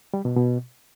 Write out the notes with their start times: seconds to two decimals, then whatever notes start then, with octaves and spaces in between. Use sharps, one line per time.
0.14 G3
0.25 B2
0.36 B2